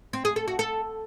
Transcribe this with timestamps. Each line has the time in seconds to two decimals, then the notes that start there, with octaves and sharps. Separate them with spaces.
0.13 C4
0.25 G#4
0.36 A4
0.48 F#4
0.59 A4